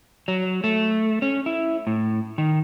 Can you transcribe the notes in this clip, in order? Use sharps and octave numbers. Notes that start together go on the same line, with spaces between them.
F#3
A3
C#4
E4
A2
D#3